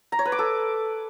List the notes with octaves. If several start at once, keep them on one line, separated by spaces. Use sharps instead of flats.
A#5
C#5
B4
D6
A4